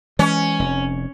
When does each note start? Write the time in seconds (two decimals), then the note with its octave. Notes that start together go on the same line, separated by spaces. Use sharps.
0.19 E3 G#3 C#4
0.59 F1